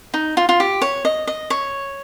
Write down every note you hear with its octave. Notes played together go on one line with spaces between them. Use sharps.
D#4
F4
F4
G4
C#5
D#5
D#5
C#5